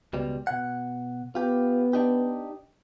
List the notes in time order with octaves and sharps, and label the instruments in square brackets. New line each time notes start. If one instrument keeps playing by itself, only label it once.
[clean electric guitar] C#2 B2 G3
B2 F#5
[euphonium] B3 [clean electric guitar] F4 G4
[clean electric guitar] D4 D#4 G4